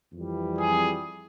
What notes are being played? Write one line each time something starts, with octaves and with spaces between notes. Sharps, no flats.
F2 E3 G3
G#4